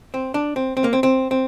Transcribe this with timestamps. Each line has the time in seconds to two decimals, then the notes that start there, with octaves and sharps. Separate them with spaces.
0.14 C4
0.34 D4
0.56 C4
0.77 C4
0.84 A#3
0.93 C4
1.03 C4
1.31 C4